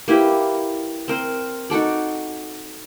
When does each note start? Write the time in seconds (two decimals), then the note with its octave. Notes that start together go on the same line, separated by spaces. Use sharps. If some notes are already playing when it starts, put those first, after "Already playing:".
0.08 A#3 E4 G4 B4
1.08 C4 A#4 C5
1.70 D#4 F#4 A4 D5